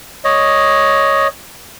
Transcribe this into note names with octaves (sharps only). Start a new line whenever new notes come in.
C#5 D#5